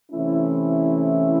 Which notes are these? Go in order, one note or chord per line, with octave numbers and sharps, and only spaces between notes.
C3 E3 A3 C#4 E4